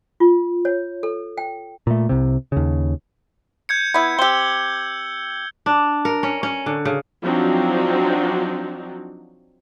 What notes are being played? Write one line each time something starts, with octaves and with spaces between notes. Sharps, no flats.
F4
C#5
A4
G5
A#2 A3
C2 C3
D#2 C#3
G6 G#6 C#7
B3 E4
C4 G4 E6 G7
D4
A#4
C#4
C#4
D3
C#3
F3 F#3 C4 D4 D#4 F#4